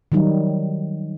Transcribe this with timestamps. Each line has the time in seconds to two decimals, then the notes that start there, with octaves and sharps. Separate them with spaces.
0.12 D#3 F#3 G3 D#4